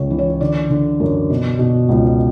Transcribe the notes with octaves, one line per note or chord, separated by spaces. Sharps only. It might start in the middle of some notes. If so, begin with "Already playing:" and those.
Already playing: C#2 C#3 C#5
E3
C#5
D3 D5
D3
F#2
B2
B2
C#2